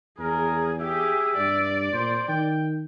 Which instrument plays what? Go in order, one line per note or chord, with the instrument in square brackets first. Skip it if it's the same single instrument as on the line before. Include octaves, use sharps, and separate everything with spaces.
[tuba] E2 [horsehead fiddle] G#4 [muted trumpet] A#4
[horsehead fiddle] G4 G#4 [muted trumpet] E5
[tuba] G2 [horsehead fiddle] D5
[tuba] A#2 [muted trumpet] C5
[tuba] D#3 [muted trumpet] G5